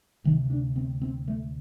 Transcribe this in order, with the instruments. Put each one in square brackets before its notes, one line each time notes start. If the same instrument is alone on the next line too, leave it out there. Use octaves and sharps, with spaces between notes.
[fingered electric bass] D2 C3 D#3
D4
C4
C4
A3